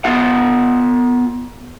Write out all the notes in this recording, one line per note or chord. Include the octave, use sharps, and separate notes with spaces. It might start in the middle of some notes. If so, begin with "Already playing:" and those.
B3 F4 F5 F#5